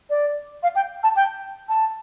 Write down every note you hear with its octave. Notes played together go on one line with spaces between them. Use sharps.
D5
F5
G5
A5
G5
A5